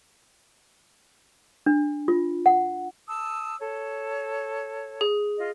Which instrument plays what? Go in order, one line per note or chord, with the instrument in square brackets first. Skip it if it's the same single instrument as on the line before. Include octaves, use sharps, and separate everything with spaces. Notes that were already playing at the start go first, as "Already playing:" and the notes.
[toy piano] D4
F4
F#5
[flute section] A5 D#6 E6
A4 C#5
[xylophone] G#4
[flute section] F4 D#5